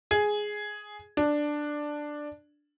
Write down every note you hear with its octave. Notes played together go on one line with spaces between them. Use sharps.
G#4
D4